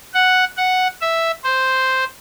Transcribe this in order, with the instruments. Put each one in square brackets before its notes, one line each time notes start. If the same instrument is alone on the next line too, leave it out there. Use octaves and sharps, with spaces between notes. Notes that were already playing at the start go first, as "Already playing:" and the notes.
[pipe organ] F#5
F#5
E5
C5